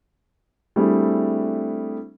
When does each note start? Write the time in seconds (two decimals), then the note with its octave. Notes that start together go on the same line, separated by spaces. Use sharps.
0.76 G3 A3 C4 D4 E4 G#4